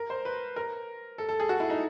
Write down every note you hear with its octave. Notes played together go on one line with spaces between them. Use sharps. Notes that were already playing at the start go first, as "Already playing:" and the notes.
Already playing: A#4
C5
B4
A#4
A4
A4
G#4
F#4
E4
D#4